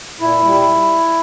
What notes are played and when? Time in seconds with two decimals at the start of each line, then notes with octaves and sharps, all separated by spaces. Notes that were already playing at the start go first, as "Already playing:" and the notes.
0.21 A#2 E4
0.44 G3